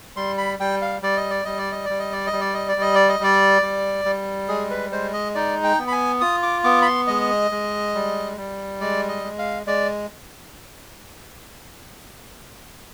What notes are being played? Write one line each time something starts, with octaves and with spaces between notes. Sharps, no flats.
G3 C6
B5
G3 G5
F5
G3 D5
D#5
D5
G3 D#5
D5
D#5
G3 D5
D#5
D5
D#5
G3
D5
D#5
D5
G3 D#5
D5
D#5
G3 D5
G3
G3
G#3 G#4
B4
G#3 C5
D#5
D#4 D5
G5
B3
B5
G#5
F4 D#6
D6
B3 D6
B5
C6
G#3 D#5
G#3
G3
G3
G#3 D5
D#5
G#3
F5
G#3 D5